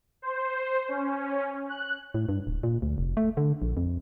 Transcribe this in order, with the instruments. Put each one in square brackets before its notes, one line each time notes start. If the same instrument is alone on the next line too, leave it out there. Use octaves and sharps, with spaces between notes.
[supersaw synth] C5
C#4
F#6
[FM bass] A2
G2
D1
A#2
D2
F1
A3
D3
A#1
F2